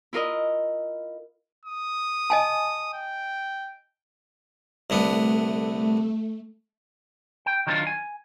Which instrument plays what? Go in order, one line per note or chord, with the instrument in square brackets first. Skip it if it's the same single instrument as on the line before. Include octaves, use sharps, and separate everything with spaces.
[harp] E4 F4 A#4 D#5
[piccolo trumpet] D#6
[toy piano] D#5 G#5 A5
[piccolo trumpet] G5
[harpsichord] C2 D3 B3 [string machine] A3
[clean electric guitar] G5
D#3 F#3 G3 C4 D4 F4
G#5